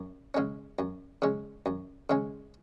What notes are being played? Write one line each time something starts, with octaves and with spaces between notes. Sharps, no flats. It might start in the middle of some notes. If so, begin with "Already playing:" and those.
Already playing: F#2
C#3 G#3 C#4
F#2
C#3 G#3 C#4
F#2
C#3 G#3 C#4